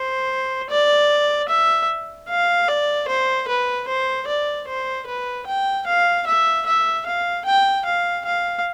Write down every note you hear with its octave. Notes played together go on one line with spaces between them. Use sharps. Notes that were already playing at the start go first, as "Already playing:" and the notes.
Already playing: C5
D5
E5
F5
D5
C5
B4
C5
D5
C5
B4
G5
F5
E5
E5
F5
G5
F5
F5